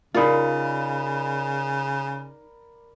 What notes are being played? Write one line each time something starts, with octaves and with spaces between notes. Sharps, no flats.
C#3 D#4 F4 A#4 D5 B5